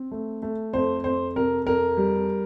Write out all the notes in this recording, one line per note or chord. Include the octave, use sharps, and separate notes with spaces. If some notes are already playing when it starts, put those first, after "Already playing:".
Already playing: C4
A3
A3
F2 C5
F2 C5
C3 A#4
F2 A#4
G3